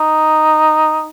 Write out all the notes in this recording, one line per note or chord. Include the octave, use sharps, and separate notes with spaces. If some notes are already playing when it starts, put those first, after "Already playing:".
Already playing: D#4